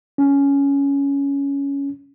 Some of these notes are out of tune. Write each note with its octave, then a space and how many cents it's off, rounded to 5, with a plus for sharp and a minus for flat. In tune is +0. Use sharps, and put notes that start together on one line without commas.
C#4 +10